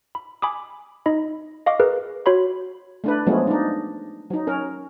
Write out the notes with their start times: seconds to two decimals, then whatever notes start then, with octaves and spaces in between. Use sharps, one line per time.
0.15 B5
0.42 G#5 B5 D6 D#6
1.06 D#4 D#5 B5
1.66 D#5 F5 C#6 D6
1.80 G#4 A#4 B4
2.26 F#4 C#5 B5 C6
3.04 A3 D4 B4
3.27 F3 F#3 G#3 A3 B3 C#4
3.47 D4 D#4
4.30 F#3 D#4
4.47 C#4 A#4